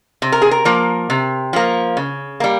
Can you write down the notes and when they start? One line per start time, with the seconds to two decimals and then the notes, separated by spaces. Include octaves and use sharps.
0.22 C3
0.32 A#4
0.42 G#4
0.51 A#4
0.65 F3 A#3
1.10 C3
1.53 F3 A#3
1.97 C#3
2.40 G3 A#3